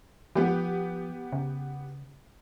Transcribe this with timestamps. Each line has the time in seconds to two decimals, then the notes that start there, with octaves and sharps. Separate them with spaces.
0.35 F3 B3 G4
1.32 C#3